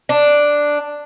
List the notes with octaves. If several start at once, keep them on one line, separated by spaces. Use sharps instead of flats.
D4